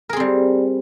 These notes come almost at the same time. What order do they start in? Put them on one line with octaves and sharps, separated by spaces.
A#4 G#4 C4 G3